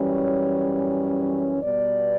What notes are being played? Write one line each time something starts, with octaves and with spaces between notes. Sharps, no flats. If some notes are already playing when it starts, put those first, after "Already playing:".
Already playing: F#2 E3 G3 C#4
C#5
C#5
B2 G3 B3 D5